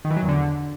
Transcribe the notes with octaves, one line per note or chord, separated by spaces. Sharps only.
D#3
E3
F#3
E2
D3